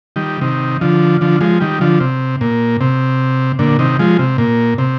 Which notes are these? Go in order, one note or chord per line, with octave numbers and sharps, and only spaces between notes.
D#3 G3
C3 D#3
D3 F3
D3 F3
F3 G#3
D#3 G3
D3 F3
C3
A#2
C3
A#2 D3
C3 D#3
F3 G#3
C3
A#2
C3